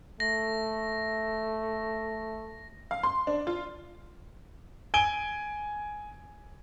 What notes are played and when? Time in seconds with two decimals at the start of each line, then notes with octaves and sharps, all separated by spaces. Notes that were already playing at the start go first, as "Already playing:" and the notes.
0.20 A3 A#6
2.91 F5
3.03 C6
3.27 D4
3.47 F4
4.94 G#5 D7 G7